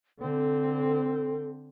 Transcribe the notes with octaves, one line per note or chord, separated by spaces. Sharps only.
D3 C4 A4